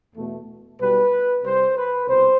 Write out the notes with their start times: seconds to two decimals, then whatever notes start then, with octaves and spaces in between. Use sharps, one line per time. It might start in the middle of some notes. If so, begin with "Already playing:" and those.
0.15 E2 B2 A3
0.79 B1 B2 G3 B4
1.43 C2 C3 G3 C5
1.75 B4
2.07 C2 B2 C5